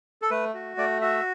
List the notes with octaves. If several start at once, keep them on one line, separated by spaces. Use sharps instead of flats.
A4
A3 B4
F#4
A3 D5
F#4 E5